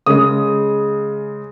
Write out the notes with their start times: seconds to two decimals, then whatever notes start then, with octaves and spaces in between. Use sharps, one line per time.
0.06 C#3 G#3 D#6